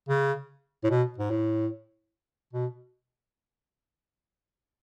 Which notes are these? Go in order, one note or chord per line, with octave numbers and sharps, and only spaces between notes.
C#3
A2
B2
G#2
A2
B2